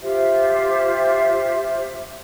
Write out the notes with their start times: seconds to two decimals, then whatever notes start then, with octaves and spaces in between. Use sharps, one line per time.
0.01 F4 G4 C5 E5